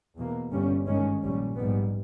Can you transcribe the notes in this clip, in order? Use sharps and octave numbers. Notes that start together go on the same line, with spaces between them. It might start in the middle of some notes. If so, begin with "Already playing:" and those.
E2 B2 A#3
G1 G2 G3 C#4
G#1 G2 D#3 G#3 C#4
A#1 A#2 G3 C#4
A#1 G#2 G3 B3